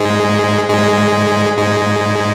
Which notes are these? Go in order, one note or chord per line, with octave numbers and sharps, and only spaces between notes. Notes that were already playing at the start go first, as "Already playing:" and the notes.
Already playing: G#2 G#3
G#2 G#3
G#2 G#3